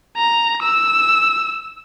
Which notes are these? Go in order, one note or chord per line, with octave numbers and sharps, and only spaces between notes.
A#5
E6